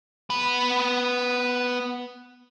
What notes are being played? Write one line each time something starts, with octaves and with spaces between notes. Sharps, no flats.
B3 B5